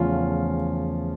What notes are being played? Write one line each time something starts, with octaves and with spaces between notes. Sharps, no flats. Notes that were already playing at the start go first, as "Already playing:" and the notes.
Already playing: E2 C#3 F3 A3 C#4 F4